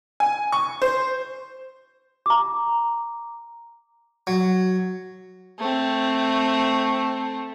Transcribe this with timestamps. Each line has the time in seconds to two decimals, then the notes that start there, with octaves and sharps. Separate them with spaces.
0.20 G#5
0.52 C#6
0.82 C5
2.26 A#5 D6
4.27 F#3
5.59 A3 C4